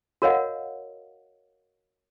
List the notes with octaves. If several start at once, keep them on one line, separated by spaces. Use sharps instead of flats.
F#4 A#4 C#5 D#5 F5 F#5